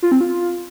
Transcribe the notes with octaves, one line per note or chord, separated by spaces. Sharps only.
F4
C4
F4